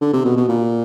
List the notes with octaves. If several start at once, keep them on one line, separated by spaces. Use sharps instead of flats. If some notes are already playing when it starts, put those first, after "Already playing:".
D3
C3
B2
B2
A#2